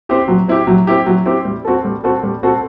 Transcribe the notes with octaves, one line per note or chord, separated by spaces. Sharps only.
C4 E4 G4
F#3
C4 E4 G4
F#3
C4 E4 G4
F#3
C4 E4 G4
G3
C4 F#4 A4
G3
C4 F#4 A4
G3
C4 F#4 A4